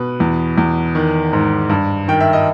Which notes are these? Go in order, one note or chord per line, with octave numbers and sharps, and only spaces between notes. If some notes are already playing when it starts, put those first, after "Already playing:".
Already playing: B2 B4
E2
E2
D#3
G#2
G2
D#3 G5
E5
D#5